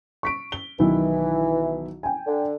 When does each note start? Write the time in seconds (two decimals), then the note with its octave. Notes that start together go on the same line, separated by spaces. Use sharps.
0.23 C#6 B6 D7
0.52 G7
0.79 B1 D#3 E3 E4
2.03 G5 G#5
2.27 D3